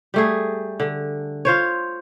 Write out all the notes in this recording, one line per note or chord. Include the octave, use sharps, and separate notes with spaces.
G3 A3 G#4
D3
F4 C5 C#5